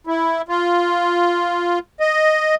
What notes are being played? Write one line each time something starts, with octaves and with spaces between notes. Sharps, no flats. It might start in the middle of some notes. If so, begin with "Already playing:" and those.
E4
F4
D#5